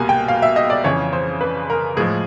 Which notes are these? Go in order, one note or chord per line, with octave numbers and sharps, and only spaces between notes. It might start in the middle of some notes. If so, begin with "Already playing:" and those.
Already playing: C2 B2 G3 A#3 G#5
G5
F5
E5
D#5
D5
F2 C#3 E3 C#5
C5
B4
A#4
A2 F3 G#3 G#4